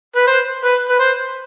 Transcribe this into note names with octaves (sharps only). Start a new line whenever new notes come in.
B4
C5
B4
B4
C5